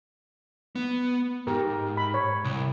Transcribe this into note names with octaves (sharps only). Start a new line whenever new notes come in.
B3
G#2 G4 A#4
B5
C#5
C2